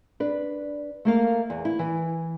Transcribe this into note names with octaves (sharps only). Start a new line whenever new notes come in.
D4 B4
A3 A#3 F5
E2
E4
E3